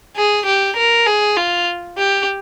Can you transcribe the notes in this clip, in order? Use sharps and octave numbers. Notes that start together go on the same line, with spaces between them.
G#4
G4
A#4
G#4
F4
G4